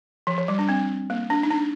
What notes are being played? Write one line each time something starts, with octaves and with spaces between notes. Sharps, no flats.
F3
F3
G3
D4
C4
A#3
D4
D#4
D4